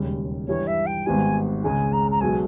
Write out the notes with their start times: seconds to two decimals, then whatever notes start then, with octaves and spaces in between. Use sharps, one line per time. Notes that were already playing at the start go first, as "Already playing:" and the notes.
Already playing: E1 D#2 C#3 G3
0.48 G2 E3 G3 C#5
0.67 E5
0.86 G5
1.06 G#1 G#2 D#3 G3 B3 G#5
1.64 C#2 C#3 G#3 G#5
1.93 A#5
2.11 A#5
2.21 B1 B2 G#3 G#5